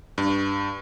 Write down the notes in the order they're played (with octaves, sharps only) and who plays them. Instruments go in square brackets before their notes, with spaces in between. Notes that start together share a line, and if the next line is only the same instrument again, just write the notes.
[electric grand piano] G2